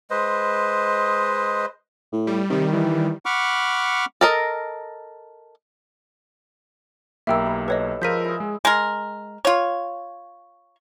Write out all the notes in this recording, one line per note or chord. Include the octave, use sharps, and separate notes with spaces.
G#3 B4 C5 D#5
A2
G3
C3 D#3 G3
E3
F#5 B5 C#6 D6 F6
A4 A#4 D#5
B1 A#3 E4 G4 A#4 E5 G5 E6
B4
A4 B4 C#5 D#5
F3 G#3 F4 A#4 E6 G6 B6 D#7
E4 G#4
G#3
G#3 A#4
F4 C#5